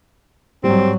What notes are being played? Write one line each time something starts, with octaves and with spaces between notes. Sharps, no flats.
G#2 F#3 G3 C4